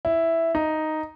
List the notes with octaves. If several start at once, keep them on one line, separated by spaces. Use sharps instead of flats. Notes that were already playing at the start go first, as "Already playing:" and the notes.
E4
D#4